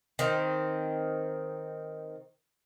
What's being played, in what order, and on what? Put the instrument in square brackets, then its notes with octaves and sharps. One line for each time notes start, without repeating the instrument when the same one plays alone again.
[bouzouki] D#3 C4